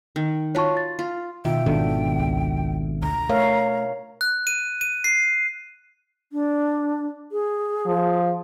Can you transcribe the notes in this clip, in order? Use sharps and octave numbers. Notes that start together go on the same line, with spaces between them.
D#3
F4 F#4 C#5 A5 C#6
A6
F4
B2 D#3 F4 E5 G5
G#1 D#3 B3 D4 F#4 A4
C#2
D2 A#5
A3 A#4 C#5 F5
F#6
D#7
D#7
C7
D4
G#4
F3